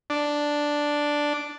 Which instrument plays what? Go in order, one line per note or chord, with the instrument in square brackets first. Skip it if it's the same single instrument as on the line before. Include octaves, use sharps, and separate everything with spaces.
[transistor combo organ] D4